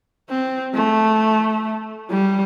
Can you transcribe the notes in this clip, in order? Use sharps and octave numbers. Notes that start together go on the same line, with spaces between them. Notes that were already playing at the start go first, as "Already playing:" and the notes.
C4
A3
G3